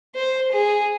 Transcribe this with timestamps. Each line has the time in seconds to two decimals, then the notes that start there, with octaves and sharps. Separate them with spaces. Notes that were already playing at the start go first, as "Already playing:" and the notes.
0.15 C5
0.52 G#4